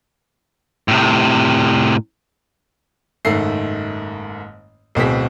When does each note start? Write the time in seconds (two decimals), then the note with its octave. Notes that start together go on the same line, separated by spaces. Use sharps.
0.88 A2 C3
3.25 F#1 G#2 D#3 A3 C7
4.95 D1 B2 C4 G#4 B6